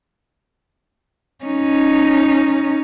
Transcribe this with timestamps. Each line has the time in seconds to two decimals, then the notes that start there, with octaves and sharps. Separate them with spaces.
1.45 C#4 D#4